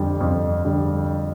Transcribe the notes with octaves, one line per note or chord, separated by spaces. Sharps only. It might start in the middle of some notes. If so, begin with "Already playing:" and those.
Already playing: F2 D3 G3
F2
D3 G3